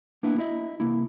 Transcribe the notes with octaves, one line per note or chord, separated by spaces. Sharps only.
A#3 B3 D4 E4
E4 D#5 E5
C2 A#3 E4